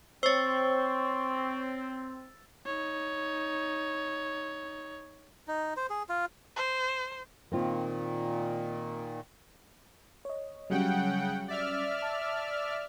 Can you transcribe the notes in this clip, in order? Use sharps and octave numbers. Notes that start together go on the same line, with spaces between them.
C4 C5 C#5 C#6 E6 A6
D#4 C#5
D#4
C5
G#4
F4
C5
A#2 D#3 A#3 C4 F4
C#5 D#5
C#3 F#3 G3 C#4 F#5 G5
D5 E5 F6
A5